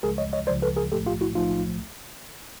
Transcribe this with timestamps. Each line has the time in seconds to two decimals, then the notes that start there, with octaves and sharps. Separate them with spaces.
0.03 C#2 C#3 F3 G#3 G#4 A#4
0.18 C#5 D#5
0.33 C#5 D#5
0.47 C#2 C#3 F3 G#3 C5 D5
0.62 A4 B4
0.77 G#4 A#4
0.92 B1 A2 F3 A3 G4 A4
1.06 F4 G4
1.21 E4 F#4
1.35 B1 A2 F3 A3 D#4 F4